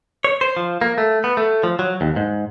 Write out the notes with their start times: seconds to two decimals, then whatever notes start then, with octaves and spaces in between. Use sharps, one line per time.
0.24 C#5
0.41 C5
0.57 F3
0.81 A#3
0.98 A3
1.24 B3
1.37 A3
1.63 F3
1.79 F#3
2.01 D#2
2.16 G#2